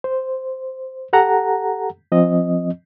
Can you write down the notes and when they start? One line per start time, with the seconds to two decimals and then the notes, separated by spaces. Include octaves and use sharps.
0.04 C5
1.13 G4 A4 F#5 A#5
2.12 F3 C4 D#5